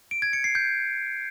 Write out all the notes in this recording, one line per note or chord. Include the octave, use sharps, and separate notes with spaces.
D7
G#6
C#7
C7
G6